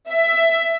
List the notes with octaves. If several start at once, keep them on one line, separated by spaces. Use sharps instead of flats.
E5